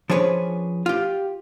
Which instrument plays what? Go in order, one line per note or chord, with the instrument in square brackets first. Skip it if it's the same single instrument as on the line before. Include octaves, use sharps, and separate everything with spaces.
[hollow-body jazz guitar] F3 C#4 D4 G#4 B4 C#5
F4 G4